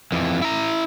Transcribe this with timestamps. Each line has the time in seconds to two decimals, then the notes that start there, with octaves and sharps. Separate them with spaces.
0.12 F2 E3
0.42 E4 A#5